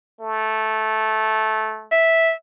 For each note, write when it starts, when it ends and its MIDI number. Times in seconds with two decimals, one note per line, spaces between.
0.20 1.87 57
1.92 2.31 76